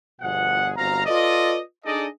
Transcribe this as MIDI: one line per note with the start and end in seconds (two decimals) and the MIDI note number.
0.21 0.71 31
0.21 0.71 47
0.21 0.71 53
0.21 0.71 68
0.21 0.71 78
0.77 1.01 31
0.77 1.01 60
0.77 1.01 66
0.77 1.01 77
0.77 1.01 82
1.06 1.59 65
1.06 1.59 69
1.06 1.59 71
1.06 1.59 74
1.06 1.59 75
1.85 2.07 62
1.85 2.07 63
1.85 2.07 68
1.85 2.07 69
1.85 2.07 74
1.85 2.07 75